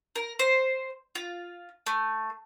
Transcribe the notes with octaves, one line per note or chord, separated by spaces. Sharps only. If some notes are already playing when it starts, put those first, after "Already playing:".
A#4
C5
F4
A3